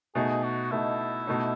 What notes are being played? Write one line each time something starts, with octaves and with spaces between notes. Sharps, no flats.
B2 A3 D#4 G#4
F#4
B2 A3 D#4 E4
B2 A3 D#4